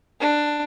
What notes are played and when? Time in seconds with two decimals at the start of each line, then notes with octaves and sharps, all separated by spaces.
0.21 D4